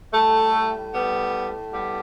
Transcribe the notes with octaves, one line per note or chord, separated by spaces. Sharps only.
A2 G3 A3
G3 B3
G3 B3